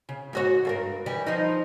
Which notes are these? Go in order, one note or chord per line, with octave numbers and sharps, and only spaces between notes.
C#3
G#2 F#4 C#5
G2 A4 A#4
E3 G3
F3 D#4